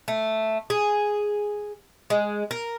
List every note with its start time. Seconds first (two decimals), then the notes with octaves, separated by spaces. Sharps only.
0.08 A3
0.70 G#4
2.10 G#3
2.51 A#4